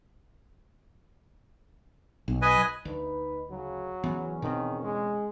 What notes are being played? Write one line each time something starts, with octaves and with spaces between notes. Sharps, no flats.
B1
B4 D#5 G#5
D2 D#4 B4
C#3 F#3
E2 C#3 E3 B3 C#4
B2 D#3 C4
G#3